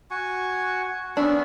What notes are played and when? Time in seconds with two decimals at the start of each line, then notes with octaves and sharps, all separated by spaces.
0.11 F#4 G#5 C#6
1.17 B3 C#4 D4 E5